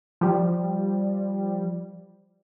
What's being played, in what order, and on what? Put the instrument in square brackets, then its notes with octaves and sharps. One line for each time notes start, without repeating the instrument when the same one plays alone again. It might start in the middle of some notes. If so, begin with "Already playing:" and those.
[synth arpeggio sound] F3 G3